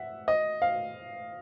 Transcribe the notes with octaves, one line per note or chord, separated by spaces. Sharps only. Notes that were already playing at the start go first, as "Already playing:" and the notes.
Already playing: E5 F#5
D#5
F5